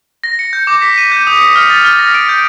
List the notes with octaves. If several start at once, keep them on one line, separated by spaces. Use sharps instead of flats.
A#6
C#7
G6
D6
B6
D#7
G6
D#6
C#7
F6
A6
F6
A#6
D7
G6